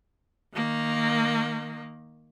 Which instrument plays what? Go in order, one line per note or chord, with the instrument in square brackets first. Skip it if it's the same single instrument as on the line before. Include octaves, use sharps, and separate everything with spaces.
[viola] D#3 A#3